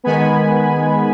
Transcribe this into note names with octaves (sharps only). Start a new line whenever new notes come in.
D#3 G#3 B3 G#5 B5